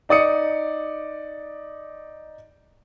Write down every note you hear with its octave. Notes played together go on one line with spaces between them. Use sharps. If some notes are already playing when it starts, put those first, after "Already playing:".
D#4 D5 D#6 C#7